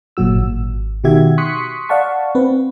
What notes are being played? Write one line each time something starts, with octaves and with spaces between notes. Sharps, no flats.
G1 A#2 F#3 F#4 E6
G#1
B2 D#3 F#4 G4 E5 G#6
C6 C#6 D#6 F#6 B6 C#7
D5 F5 F#5 A5 C#6
C4 B4